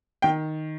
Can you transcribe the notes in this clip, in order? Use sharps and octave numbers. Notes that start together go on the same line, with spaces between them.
D#3 G5